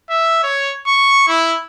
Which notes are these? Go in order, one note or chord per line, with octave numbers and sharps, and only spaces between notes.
E5
C#5
C#6
E4